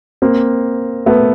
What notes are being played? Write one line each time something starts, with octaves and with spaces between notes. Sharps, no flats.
A#3 C4
A3 B3